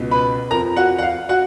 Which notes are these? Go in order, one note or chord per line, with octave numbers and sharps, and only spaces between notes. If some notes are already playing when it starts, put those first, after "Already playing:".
Already playing: C#2 B2
B4 B5
F2 F3 A#4 A#5
F#4 F#5
F#5
F5
F#4 F#5